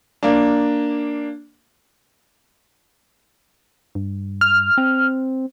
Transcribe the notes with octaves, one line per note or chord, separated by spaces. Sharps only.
A#3 D4
G2
F6
C4